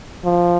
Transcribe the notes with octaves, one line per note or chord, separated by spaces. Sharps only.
F3